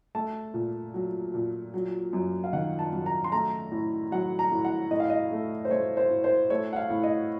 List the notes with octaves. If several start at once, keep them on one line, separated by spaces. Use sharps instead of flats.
A3 A5
A#2
F#3
A#2
F#3
F#2
F5
D#3 F#5
A5
F#2
A#5
C6
A3 A#5
A2
F#3 F#5
A#5
A2
F#5
A2 D#5
F5
D#5
A3
C5
A3 C#5
C5
A2
C5
A3 C#5
F#5
F5
A2
D#5